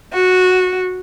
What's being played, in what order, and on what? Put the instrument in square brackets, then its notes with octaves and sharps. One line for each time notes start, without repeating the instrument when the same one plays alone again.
[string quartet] F#4